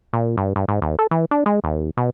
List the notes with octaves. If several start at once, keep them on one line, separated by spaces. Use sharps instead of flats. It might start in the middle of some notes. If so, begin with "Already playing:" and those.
A#2
G2
G2
G#2
D#2
A4
E3
D4
G#3
D#2
B2